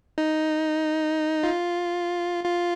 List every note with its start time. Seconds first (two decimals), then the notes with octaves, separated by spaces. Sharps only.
0.18 D#4
1.43 F4
2.44 F4